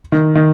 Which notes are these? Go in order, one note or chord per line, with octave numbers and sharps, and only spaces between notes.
D#3
D#3